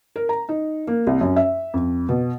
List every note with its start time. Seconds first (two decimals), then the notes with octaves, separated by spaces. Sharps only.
0.16 A#4
0.29 A#5
0.49 D#4
0.87 A#3
1.07 C2
1.21 F#2
1.36 E5
1.74 F2
2.09 B2